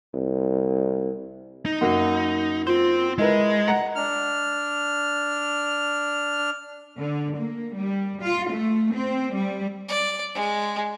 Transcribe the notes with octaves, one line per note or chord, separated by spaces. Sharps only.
C2
D#4
F#2 A#3 F#4
C4 F4 C5
G#3 E4 A#4 B4 D#5
F#5 A#5
D4 F6
D3
A#3
G3
F4
A3
C4
G3
D5
G#3